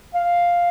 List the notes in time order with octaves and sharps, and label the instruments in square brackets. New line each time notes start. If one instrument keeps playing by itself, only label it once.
[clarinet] F5